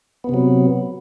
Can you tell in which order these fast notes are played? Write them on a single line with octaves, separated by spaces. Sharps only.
B3 C3 F#3